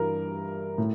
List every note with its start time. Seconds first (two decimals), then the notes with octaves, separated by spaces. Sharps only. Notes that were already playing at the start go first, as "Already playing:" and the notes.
Already playing: G2 E3 A#4
0.78 A2